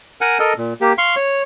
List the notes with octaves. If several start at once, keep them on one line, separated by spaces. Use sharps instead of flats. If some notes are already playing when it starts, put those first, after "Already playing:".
A#4 F#5 G#5
A4 A#4 D#5
A#2
A#3 G4
F5 C6 C#6
C#5